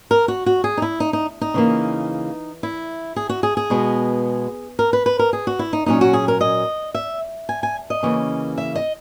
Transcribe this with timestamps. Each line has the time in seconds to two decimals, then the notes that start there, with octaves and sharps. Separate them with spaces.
0.11 A#4
0.28 F#4
0.46 F#4
0.64 G#4
0.77 D#4
0.82 E4
1.00 D#4
1.13 D#4
1.41 D#4
1.54 C#3 E3 A#3
2.63 E4
3.16 G#4
3.29 F#4
3.43 G#4
3.57 G#4
3.70 B2 G#3 B3
4.79 A#4
4.93 B4
5.06 B4
5.19 A#4
5.33 G#4
5.47 F#4
5.59 E4
5.73 D#4
5.86 A#2 F#3 C#4 D#4
6.01 F#4
6.13 G#4
6.28 A#4
6.41 D#5
6.94 E5
7.49 G#5
7.63 G#5
7.90 D#5
8.03 C#3 E3 A#3 C#4
8.58 E5
8.75 D#5